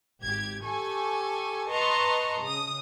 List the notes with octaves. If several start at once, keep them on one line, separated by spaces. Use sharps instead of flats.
G#1 G4 G#6
G4 A4 G#5 C#6
B4 D#5 A5 A#5 C6 C#6
C#3 D#6